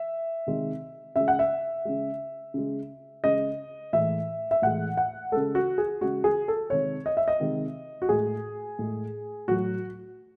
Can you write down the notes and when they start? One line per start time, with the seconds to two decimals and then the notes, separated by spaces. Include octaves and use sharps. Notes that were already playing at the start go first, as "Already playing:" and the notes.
Already playing: E5
0.47 C3 D#3 G#3
1.16 C#3 G#3 E5
1.28 F#5
1.39 E5
1.85 C#3 G#3
2.54 C#3 G#3
3.24 C#3 G#3 D#5
3.93 A2 E3 G#3 E5
4.51 E5
4.62 A2 E3 G#3 F#5
4.97 F#5
5.32 C#3 G#3 A4
5.55 F#4
5.78 G#4
6.01 C#3 G#3 F#4
6.24 G#4
6.48 A4
6.70 C3 D#3 G#3 C#5
7.06 D#5
7.17 E5
7.28 D#5
7.40 C3 D#3 G#3
8.02 F#4
8.09 A2 G#3 G#4
8.79 A2 G#3
9.48 A2 F#3 F#4